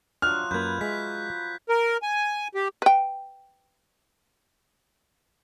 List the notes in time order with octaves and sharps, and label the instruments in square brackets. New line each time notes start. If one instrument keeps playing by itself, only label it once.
[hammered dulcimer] F3 F#3 [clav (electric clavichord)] D4 [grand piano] F6 [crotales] F#6
[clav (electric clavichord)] F#2 A#3 [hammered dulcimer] B4 B5 [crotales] G6 G#6
[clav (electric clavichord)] G#3 E5 [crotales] B6
[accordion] A#4
G#5
G4
[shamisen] B4 G5